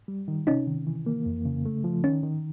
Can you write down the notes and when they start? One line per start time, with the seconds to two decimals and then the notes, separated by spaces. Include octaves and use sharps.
0.08 G3
0.28 D#3
0.47 C3 C#4 D#4
0.67 D#3
0.87 E3
1.06 A#3
1.26 F2
1.45 C#3
1.65 A3
1.84 F3
2.04 D#3 C#4
2.23 D#3